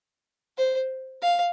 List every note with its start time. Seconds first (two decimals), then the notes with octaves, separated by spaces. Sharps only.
0.58 C5
1.22 F5